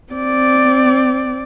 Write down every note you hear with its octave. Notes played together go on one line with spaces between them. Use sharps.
C4 D5